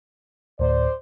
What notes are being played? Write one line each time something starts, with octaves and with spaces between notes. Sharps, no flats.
D2 A2 C5 D5